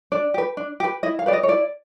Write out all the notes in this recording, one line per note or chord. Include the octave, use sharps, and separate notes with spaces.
D4 D5
G4 B4
D4
G4 B4
E4 D#5
F5
G4 B4 D5
D#5
C#5
E4 D5